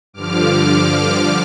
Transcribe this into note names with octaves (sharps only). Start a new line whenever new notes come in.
G2 D3 F3 D6 F6